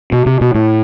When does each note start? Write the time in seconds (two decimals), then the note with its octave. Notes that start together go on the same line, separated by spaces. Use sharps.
0.12 B2
0.26 C3
0.41 B2
0.55 A2